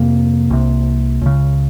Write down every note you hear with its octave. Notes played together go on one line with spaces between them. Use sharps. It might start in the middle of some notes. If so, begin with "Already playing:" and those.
Already playing: F2 C3 A#3
C2 C3
C#2 C#3